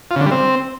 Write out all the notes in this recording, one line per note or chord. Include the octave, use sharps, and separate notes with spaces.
F4
C#3
D3
G3
C4